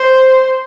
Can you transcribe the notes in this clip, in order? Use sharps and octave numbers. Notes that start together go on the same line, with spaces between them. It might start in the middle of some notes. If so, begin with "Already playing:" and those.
Already playing: C5